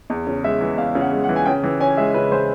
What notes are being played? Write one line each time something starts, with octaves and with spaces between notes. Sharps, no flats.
E2
C#3
G#3 E5
E3
E2 F5
C#3
F#5
G#3
F#5
E3
G#5
C#3 G5
E3
C#4 G#5
G#3 E5
C#3 B4
E3 C5